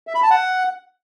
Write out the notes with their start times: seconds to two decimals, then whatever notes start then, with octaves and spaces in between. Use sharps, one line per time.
0.07 E5
0.15 B5
0.23 A5
0.30 F#5